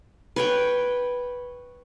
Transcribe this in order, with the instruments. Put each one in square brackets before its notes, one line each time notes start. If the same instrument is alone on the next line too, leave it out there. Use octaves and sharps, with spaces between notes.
[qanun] B4 C#5 G5